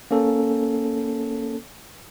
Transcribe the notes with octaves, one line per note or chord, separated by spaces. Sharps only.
A#3 C#4 A4